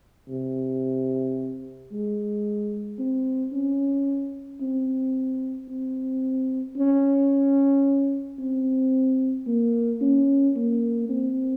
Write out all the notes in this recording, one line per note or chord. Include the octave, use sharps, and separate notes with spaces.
C3
G#3
C4
C#4
C4
C4
C#4
C4
A#3
C#4
A#3
C4